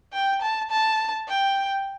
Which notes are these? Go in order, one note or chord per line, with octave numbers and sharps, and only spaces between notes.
G5
A5
A5
G5